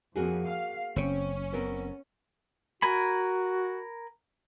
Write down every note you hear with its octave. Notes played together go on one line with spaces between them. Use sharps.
F2 A#3 F#4 G#4
F5
F#1 C#3 C4 C#4 C#5
B3 C4 A#4
F#4 A#4 G#5 B5